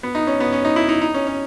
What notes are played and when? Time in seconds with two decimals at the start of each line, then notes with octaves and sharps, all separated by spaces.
0.03 B3
0.15 D#4
0.27 C#4
0.40 B3
0.52 C#4
0.65 D#4
0.76 E4
0.89 D#4
1.01 D#4
1.14 C#4
1.27 C#4